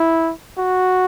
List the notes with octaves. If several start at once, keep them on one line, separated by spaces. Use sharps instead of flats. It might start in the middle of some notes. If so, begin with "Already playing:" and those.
Already playing: E4
F#4